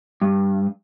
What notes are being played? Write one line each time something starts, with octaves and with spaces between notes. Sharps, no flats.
G2